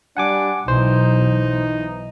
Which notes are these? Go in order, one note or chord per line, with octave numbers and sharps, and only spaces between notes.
G3 D4 F#5 G#5 D6
B1 B2 E3 D#4 C5